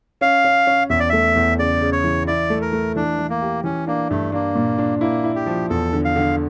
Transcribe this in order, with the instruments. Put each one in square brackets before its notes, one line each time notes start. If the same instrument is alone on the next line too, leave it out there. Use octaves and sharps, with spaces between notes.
[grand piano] C#4 [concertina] F5
[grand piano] C#4
C#4
[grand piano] E2 [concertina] E5
[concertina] D5
[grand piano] A3 [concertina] E5
[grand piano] E2
[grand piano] C#3 [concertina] D5
[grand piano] C#3
[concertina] C#5
[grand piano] E3
[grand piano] E4 [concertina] D5
[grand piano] A3
[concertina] A#4
[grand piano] A3
[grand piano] E3 [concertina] D4
[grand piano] E3
[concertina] A#3
[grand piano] G4
[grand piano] E3 [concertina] C#4
[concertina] A#3 [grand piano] D4
[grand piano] G2 [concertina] A3
[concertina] A#3 [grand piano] D4
[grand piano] A#2
D4
[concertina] A#3 [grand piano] E4
[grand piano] E4
[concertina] G4
[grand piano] F3
[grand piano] E2 [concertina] A4
[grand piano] D3
[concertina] F5
[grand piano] D3